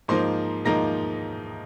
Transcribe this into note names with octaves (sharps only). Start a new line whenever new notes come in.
G#2 F3 A#3 D#4 C5 C6
G#2 F3 A#3 D#4 A#5 A#6